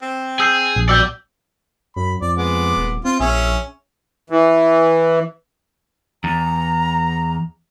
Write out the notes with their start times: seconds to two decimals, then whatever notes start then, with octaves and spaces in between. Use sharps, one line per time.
0.02 C4
0.40 G#4 E6 G6 C7
0.76 A#1
0.89 B2 D5 G5 E6 G6
1.96 F#2 B5
2.21 F2 D5
2.36 G#3 B3 D6
2.77 D#1
3.05 C4 F4
3.20 A#1 C#4 G#4 E5
4.30 E3
6.24 E2 A#5